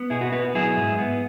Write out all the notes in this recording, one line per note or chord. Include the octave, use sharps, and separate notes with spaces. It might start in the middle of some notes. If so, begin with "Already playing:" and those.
Already playing: B3
B2 E4 G#4
F#4 B4
B3 F#4 B4
F#3 E4 G#4
G#2
B3